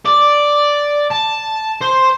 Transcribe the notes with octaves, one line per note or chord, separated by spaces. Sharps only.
D5
A5
C5